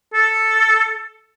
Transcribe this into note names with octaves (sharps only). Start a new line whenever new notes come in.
A4